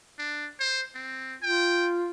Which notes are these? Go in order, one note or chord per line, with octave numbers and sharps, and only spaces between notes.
D4
C5
C4
F4 G5